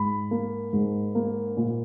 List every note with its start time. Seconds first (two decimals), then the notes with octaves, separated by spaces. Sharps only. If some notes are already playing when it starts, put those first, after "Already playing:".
Already playing: G#2 B5
0.31 A#3
0.73 G#2
1.15 A#3
1.57 A#2